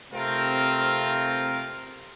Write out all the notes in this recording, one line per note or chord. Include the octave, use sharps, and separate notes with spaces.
C3 A3 C4 F4 A#4